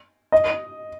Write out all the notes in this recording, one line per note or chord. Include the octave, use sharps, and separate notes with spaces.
D#5